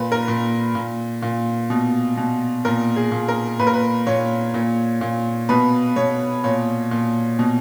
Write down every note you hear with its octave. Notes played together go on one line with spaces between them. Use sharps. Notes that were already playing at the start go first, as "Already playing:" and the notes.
Already playing: A#2 B4
A#4
A#2
A#2
A#2
B2
B2
A#2 A#4
G#4
A#2
A#4
A#2 B4
A#4
B4
A#2 C#5
A#2
A#2
B2 B4
B2 C#5
A#2 C#5
A#2
B2